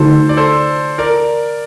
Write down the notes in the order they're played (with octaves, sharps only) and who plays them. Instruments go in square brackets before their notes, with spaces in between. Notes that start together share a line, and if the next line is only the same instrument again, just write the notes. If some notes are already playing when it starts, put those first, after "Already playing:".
Already playing: [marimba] D3 A3 D#4 F#4 [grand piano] A4 C5
[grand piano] D5
A4 C5
A#4 D5